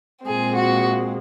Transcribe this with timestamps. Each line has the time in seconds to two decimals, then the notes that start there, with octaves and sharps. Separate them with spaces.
0.25 A#2 G#3 C4 G#4
0.54 F#4